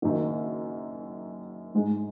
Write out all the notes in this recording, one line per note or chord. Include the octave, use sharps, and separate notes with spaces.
F#1 F#2 D#3
G#2 G#3 D#4